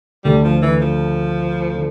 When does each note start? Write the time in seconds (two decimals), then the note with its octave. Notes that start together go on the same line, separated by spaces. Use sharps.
0.25 D2 D3 G3 A3
0.44 F3
0.62 E3
0.81 F3
1.75 D3